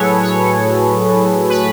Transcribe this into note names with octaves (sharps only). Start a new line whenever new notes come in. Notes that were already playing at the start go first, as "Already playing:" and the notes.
Already playing: A2 F#3 G#4 A4 B4 C#5
C#5
B4